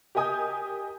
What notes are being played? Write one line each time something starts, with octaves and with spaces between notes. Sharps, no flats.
G4 A#4 D#5 G#5 D#6 G6